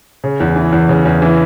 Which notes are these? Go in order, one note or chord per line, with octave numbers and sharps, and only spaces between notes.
C#3
E2
E3
E2
C#3
E2
E3